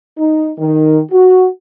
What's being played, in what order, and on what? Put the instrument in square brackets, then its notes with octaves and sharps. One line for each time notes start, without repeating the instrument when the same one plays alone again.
[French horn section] D#4
D#3
F#4